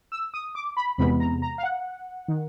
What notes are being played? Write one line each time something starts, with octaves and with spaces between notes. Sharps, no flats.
E6
D#6
D6
B5
E2 C3 E3 G#3 B3 B5
A#5
A#5
F5
F#5
D#3